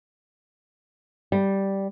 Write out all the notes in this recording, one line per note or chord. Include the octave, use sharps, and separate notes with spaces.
G3